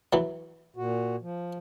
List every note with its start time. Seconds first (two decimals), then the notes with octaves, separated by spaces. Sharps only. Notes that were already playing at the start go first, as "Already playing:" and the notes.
0.13 E3 F#3
0.77 A#2 F#4
1.22 F3